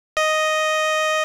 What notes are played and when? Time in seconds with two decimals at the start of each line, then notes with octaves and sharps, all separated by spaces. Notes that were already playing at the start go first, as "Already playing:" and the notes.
0.17 D#5